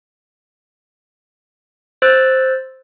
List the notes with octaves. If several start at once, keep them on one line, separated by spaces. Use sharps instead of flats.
C5 E6 F#6 A6